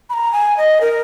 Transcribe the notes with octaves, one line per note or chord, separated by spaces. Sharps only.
B5
A#5
G#5
D#5
A#4